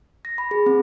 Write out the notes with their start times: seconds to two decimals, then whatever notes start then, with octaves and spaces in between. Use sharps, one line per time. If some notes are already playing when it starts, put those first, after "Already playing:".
0.25 A#6
0.38 B5
0.51 G#4
0.66 C4